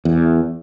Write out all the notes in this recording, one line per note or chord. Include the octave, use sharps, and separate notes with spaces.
E2